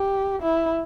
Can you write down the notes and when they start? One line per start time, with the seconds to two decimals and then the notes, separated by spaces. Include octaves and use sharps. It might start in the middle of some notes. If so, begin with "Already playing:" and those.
Already playing: G4
0.42 E4